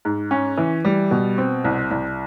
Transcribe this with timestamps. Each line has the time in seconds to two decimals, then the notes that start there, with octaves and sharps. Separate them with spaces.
0.05 G#2
0.31 C#4
0.58 E3
0.85 G3
1.11 B2
1.38 C4
1.64 C2
1.91 C2